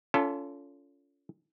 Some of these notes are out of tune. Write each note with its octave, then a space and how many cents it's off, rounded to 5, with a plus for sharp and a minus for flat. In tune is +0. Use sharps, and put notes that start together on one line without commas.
C#4 +30 F4 -20 A4 +5